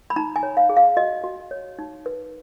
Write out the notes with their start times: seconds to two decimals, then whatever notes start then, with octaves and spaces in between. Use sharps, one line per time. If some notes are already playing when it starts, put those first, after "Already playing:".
0.10 B5
0.16 D#4 A#5
0.36 G#5
0.43 C#5
0.57 F5
0.69 G#4
0.77 F5
0.97 F#4 D#5
1.24 F#4
1.51 C#5
1.79 D#4
2.06 B4